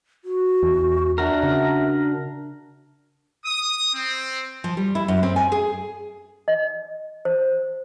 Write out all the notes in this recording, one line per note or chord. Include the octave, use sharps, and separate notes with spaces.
F#4
E2
D4 F#4 A#4 E5
C#3
D#6
C4
F3
G3
E4
F#2
C4
G#5
G#4
D#5
C5